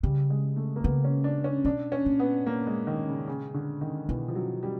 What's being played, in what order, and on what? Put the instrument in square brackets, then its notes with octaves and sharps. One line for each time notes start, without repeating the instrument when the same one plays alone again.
[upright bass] C#3 [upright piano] G3
[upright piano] G#3
A3
A#3
[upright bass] C#3 [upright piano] B3
[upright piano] C#4
D4
C#4
[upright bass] B2 [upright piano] D4
[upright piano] C#4
[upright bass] A#2
[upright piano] B3
A#3
G#3
D#3
C#3
C#3
D3
D#3
[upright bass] B2 [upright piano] E3
[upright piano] F3
F#3
G3